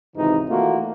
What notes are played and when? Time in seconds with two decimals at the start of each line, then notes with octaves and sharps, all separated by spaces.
0.15 G#1 C#2 C3 E3 D#4
0.48 E3 A3 A#3 F4 F#4